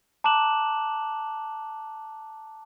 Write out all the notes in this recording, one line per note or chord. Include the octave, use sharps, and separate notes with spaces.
A5 A#5 D6 F#6 E7 F#7